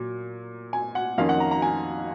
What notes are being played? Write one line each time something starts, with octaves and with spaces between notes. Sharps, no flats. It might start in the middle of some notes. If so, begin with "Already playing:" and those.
Already playing: A#2 F#3
G#5
F#5
F2 D#3 A#3 C#4 F4 F5
F#5
A#5
A#5
G#5